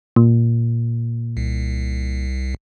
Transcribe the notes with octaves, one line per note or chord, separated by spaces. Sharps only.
A#2
C2